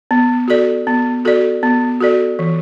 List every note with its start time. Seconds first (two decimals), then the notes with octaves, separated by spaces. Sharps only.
0.11 B3
0.48 F#4 A4 D5
0.87 B3
1.25 F#4 A4 D5
1.63 B3
2.01 F#4 A4 D5
2.39 E3